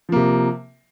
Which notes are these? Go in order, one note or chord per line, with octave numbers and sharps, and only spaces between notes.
C3 F3 A#3